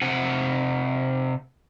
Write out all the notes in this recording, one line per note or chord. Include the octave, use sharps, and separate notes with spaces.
C3 F#5 G#5